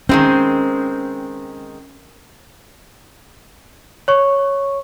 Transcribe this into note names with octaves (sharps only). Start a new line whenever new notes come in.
D#3 G#3 C4 C#4
C#5 C#6